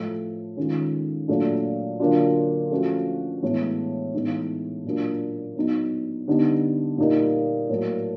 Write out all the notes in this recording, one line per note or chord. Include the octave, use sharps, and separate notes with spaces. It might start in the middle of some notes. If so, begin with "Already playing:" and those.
Already playing: A2 F3 A3
D#3 G#3 C#4 F4
A#2 F#3 A3 D4
D3 F#3 A#3 D4 F4
F3 A3 C#4 F#4
A2 E3 G#3 B3 E4
A2 E3 G#3 B3 D#4
A#2 F#3 A#3 D4 F4
F#3 B3 D#4
D3 G3 B3 D#4
A#2 G3 A#3 D#4
A2 F#3 A#3